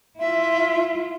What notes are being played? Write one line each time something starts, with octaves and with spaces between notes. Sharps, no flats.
E4 F4 E5